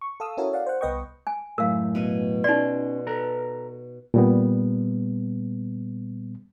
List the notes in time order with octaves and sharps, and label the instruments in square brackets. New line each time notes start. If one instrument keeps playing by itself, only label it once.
[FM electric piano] C#6
A4 F5 D#6 E6
C#4 E4 F#4 A4 A#4 C#5
D5 F5 F#5
C5 F#5
C2 B3 B4 D#5 G5 C#6
[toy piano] G#5
[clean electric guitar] F#2 A2 [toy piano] A#4 F5
[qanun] B2 G#5
[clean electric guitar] C#4 C6 [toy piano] D#4 D5
[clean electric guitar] A4 B4 A#5
[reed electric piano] A#2 G3 B3